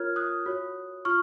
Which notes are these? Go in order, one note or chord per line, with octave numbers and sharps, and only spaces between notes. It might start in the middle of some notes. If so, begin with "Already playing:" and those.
Already playing: F4 A#4 C#5 F6 G#6
D#6 F#6
F#4 C#5
F4 C#6 F6